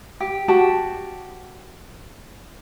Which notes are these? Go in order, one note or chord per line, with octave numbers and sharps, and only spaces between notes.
G4
F#4 G4 A5